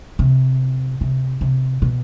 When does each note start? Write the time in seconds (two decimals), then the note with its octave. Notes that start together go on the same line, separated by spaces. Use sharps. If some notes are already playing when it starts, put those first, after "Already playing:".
0.19 C3
1.01 C3
1.41 C3
1.82 B2